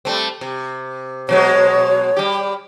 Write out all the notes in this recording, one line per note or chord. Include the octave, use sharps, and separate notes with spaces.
G3 A3 C4
C3
B2 F#3 G#3 C#5
G3 G4